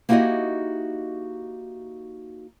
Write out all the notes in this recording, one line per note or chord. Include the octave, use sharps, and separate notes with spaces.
A#3 D#4 E4 F#4 G4 D#5